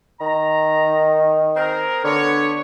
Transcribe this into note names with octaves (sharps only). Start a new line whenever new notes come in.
D#3 A#5
C4 G#4 A#4
D3 B3 C#5